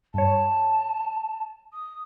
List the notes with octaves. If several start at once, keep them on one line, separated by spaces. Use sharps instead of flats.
G2 C#5 A5
D#6